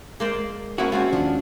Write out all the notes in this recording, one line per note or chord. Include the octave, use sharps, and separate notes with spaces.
G#3 A#3 C5 D5
F3 A#3 C#4 E4 F#4
G#3 C4 C#4 F4 F#4
D#2 F3 D4